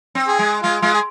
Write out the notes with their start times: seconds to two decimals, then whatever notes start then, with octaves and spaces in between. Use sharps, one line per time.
0.15 C4
0.28 G#4
0.39 G#3
0.63 G#3 F4
0.82 G#3 F4
0.94 G#4